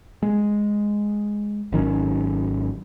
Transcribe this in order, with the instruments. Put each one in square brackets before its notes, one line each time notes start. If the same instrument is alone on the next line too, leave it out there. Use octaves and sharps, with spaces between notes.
[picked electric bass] G#3
G#1 D#3 F#3 C#4